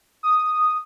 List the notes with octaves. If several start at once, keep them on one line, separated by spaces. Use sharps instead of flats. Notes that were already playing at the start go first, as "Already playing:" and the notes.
D#6